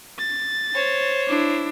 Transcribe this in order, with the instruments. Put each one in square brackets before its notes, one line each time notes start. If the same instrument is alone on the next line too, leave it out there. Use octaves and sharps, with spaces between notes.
[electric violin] A6
[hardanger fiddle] C5 C#5
[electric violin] D4 E4